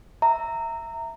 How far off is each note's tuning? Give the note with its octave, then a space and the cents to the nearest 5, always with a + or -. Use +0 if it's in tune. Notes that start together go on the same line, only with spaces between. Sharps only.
E5 +0 A#5 -20